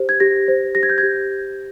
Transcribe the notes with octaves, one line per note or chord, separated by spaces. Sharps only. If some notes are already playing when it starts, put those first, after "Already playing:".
Already playing: G4 C5
G#6
G4 A#6
C5
G4 A#6
G#6
G6
G#6
G4